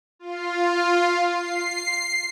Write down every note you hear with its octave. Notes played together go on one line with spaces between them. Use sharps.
F4
C7